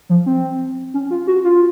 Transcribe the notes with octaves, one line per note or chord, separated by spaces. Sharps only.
F3
C4
C#4
F4
F#4
F4